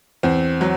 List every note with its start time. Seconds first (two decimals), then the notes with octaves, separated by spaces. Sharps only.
0.23 E2 C4
0.61 F#3